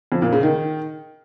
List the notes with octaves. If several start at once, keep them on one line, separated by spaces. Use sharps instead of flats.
F2
A#2
C#3
D#3